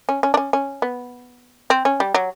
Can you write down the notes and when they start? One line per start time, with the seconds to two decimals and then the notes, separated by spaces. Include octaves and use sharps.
0.09 C#4
0.23 C#4
0.34 D4
0.37 C#4
0.53 C#4
0.82 B3
1.70 C4
1.85 C#4
2.00 G3
2.15 F#3